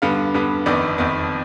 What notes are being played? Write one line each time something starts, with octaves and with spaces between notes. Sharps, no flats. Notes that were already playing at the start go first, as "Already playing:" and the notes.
G2 D3 G3 B3 F5
G2 D3 G3 B3
G1 F2 D#3 B3 D5
G1 F2 D#3 B3